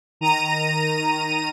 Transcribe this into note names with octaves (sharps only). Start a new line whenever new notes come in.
D#3 A#5 D#7